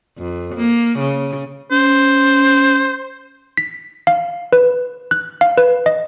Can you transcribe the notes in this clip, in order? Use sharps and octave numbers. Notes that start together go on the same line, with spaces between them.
F2
A#3
C#3
C#4 C5
B6
F5
B4
F#6
F5
B4
D#5